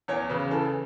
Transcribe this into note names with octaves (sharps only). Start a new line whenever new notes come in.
E2 C#5
C#3 B4
E3 A4